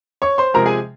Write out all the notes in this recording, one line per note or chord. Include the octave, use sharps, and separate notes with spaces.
C#5 C#6
C5 C6
C3 F3 G#3 A#4 A#5
G#4 G#5